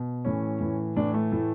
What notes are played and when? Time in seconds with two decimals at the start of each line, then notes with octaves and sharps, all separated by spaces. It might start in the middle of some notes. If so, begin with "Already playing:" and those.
Already playing: B2
0.25 A2 E3 C#4
0.60 A2 E3
0.96 A2 E3 D4
1.14 A3
1.32 A2 E3